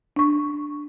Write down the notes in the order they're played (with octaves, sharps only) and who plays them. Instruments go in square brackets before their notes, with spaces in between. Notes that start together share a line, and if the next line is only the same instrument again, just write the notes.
[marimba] D4 C#6